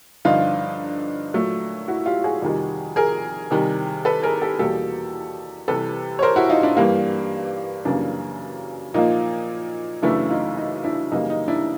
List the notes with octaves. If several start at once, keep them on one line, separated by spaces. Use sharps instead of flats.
G2 D3 F3 D#4 F4
A#2 F#3 A3
E4 F#4
F4 G4
F#4 G#4
F2 C3 D#3 G3
G#4 A#4
C3 D#3 G3
A4 B4
G#4 A#4
G4 A4
E2 B2 G3 A#3 G4 A4
C3 E3 G3 A4 B4
C#5
A#4 C5
E4 F#4
D#4 F4
D4 E4
G2 E3 G3 A#3
F#2 C#3 E3 G3 A#3 D4
A#2 F3 A#3 D#4
F#2 C#3 E3 A3 D4 E4
D#4 F4
D#4
D4 E4
F#2 C#3 E3 G3 A#3 D#4
D#4
D4 E4